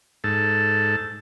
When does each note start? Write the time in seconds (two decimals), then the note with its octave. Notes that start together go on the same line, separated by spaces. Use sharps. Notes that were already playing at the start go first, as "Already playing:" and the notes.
0.24 G#2 A4